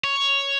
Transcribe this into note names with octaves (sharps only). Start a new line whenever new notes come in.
C#5